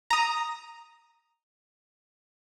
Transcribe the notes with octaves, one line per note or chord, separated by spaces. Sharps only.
A#5 D#6